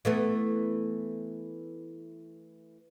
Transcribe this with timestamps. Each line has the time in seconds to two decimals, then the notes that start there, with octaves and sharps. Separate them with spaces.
0.05 E3 A3 B3